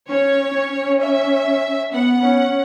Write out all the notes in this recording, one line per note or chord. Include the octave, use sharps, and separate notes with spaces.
C#4 C#5
C#4
E5
B3 F#5
C#4